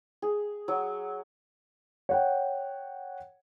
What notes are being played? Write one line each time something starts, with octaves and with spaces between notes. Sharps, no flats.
G#4
F#3
C#5 F#5 G5